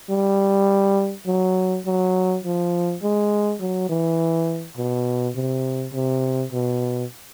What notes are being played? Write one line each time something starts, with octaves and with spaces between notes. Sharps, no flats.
G3
F#3
F#3
F3
G#3
F#3
E3
B2
C3
C3
B2